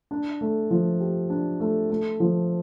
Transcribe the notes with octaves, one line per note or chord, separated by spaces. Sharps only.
D4
A3
F3
G4
D4
A3
A3
F3